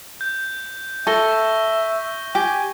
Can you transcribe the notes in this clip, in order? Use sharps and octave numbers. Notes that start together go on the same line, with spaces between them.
G6
A4 E5 C#6 A#6 G7
G4 G#5